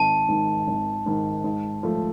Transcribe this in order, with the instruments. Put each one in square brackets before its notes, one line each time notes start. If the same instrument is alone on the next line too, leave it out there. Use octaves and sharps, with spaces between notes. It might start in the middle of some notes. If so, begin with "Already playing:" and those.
Already playing: [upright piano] G#1 [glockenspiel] A5
[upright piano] G#2 D#3
G#1
G#2 D#3
G#2
F3 A3